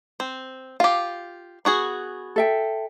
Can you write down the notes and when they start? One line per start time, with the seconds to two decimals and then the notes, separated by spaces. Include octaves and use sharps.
0.20 C4
0.80 F4 G4 F5
1.65 B3 F#4 G#4
2.36 A4 E5 G5